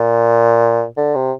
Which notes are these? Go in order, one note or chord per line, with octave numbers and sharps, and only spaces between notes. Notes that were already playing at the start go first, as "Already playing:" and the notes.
Already playing: A#2
D3
C3